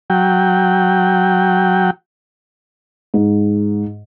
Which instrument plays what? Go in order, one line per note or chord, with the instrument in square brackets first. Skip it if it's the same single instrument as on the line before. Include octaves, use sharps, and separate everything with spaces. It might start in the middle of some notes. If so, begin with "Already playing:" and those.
[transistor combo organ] F#3 G5
[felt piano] G#2